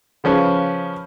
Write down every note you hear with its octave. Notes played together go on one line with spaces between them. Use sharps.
C#3 F3 C#4 B4